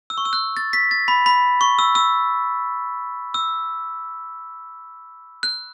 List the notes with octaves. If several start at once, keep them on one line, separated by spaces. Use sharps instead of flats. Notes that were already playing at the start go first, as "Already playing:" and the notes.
E6
C#6
E6
F#6
A6
B6
A6
B5
B5
C#6
E6
E6
E6
F#6